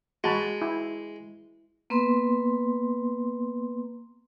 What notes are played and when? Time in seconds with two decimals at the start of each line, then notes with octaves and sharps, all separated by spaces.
0.24 G#3 F#4 A5 B5
0.61 E4
1.90 A#3 B3 B4 C6